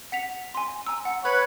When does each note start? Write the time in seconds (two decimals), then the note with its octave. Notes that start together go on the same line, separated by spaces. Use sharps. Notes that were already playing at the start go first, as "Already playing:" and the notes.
0.12 F#5 B6 F7
0.55 G#5 C6
0.87 G#5 A#5 E6
1.05 F#5
1.24 B4 C#5